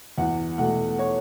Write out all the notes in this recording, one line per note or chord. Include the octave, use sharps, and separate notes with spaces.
E2 F#5
B2 A3 F#5
C#5